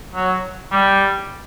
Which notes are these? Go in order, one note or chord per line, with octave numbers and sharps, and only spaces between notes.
F#3
G3